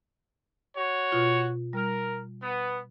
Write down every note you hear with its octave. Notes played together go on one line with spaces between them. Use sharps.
F#4 C#5
B2 F4
G3 A#4
B3